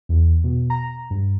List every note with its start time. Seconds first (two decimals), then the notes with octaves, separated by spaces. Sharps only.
0.09 E2
0.44 B2
0.70 A#5
1.10 G2